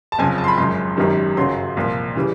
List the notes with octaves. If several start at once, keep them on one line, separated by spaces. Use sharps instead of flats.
A5
F#1 F2 C#3 F3 G#5
A5
C6
B5
G#1 F#2 C#3 C6
G#1 F#2 D#3 G3
G1 F#2 C#3 F#3 C6
C2 A#2 F3
C#3 E3 G3